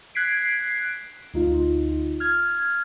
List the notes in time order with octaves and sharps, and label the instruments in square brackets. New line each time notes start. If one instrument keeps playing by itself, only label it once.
[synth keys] F#6 G#6 B6 C7 D7
D2 D#4 F4
F6 G#6